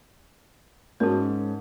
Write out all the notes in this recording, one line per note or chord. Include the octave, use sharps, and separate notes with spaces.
G#2 C#4 F#4 A#4 A5